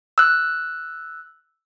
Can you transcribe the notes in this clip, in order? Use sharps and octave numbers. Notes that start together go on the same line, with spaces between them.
E6 F#6